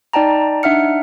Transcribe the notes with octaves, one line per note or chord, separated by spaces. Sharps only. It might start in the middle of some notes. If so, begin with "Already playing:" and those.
D#4 D5 G5 A5 A#5
D4 D#4 E5 F#5 F6 C#7